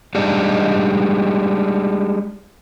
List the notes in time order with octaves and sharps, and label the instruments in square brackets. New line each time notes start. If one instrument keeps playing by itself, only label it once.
[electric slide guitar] G3 G#3 D4 D#4